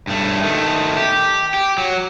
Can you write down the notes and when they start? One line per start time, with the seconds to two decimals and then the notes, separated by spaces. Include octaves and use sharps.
0.07 G2 A3
0.43 D#3 A3
0.97 G4
1.54 G4
1.78 F#3